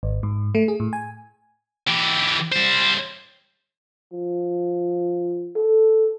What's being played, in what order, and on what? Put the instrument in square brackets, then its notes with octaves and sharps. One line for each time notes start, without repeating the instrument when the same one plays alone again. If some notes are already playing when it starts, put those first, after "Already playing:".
[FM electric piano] G#1
G#2
A3
G#4
A2
G#5
[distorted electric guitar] E3 G4
G3 C5
[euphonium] F3
A4